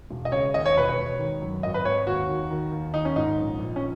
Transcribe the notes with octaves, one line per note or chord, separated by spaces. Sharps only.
E1
D#5
C#3 C#5
D#2 D#5
C#5
E1 B4
C#5
E1
D#3
F#2
G#1 D#5
B4
G#1 C#5
D#2 F#4
D#3
D#3
D#2
D#3 D#4
C#4
G#2 D#4
A#1
A#1
C#4